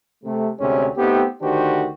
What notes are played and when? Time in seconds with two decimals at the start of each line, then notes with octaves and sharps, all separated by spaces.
0.24 C3 A3
0.58 D2 C3 G#3 C#4
0.97 A3 B3 C4 D#4 G4
1.41 D2 D#3 D4 F#4 G4 C5